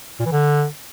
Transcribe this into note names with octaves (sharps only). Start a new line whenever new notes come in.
A#2
E3
D3